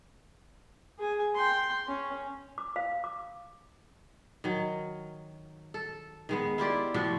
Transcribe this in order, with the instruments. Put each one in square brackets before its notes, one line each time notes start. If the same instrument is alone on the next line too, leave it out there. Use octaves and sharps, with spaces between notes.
[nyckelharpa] G#4 G#5
G5 C6
C#4
[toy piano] D6
F5
D6
[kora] D#3 F#3
A4
D#3 G#3 B3
E4 F4 G4 D5
A2 C3 F3 F#4